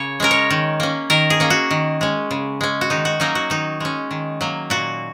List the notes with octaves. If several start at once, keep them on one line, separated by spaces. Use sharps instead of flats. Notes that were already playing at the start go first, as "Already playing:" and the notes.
Already playing: C#3 A#3 C#5
G#3 C#4 A#4
C#5
D#3
A#3 C#4
D#3 A#4
G#4
A#3 C#4
F#4
D#3
G#3 C#4
C#3
G#3 C#4
F#4
D#3 D#4
F#4
F#3 A#3 C#4 D#4
F#4
D#3 D#4
G#3 C#4
D#3
F#3 A#3
A#2 F#4